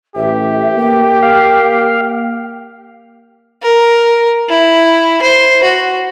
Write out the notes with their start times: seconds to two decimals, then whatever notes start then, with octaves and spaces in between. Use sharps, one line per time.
0.16 A1 G4 E5
0.77 A#3 G5
1.23 F5
3.62 A#4
4.49 E4
5.22 C5
5.63 F#4